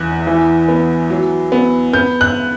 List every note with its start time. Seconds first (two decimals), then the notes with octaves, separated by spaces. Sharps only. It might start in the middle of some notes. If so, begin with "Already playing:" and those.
Already playing: E2 E3 F#6
0.27 E3
0.69 B3
1.10 F#3
1.52 B3
1.93 B3 G6
2.21 F#6